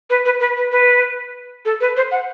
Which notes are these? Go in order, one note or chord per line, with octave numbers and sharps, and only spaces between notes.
B4
B4
B4
B4
B4
A4
B4
C5
F#5